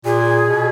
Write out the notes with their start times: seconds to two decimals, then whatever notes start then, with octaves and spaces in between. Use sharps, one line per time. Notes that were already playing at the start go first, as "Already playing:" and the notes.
0.05 A#2 G#4
0.48 B2